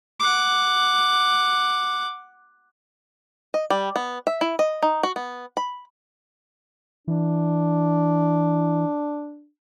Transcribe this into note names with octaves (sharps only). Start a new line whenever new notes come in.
F#5 D6
D#5
G3
B3
E5
E4
D#5
D#4
F#4
B3
B5
E3 D4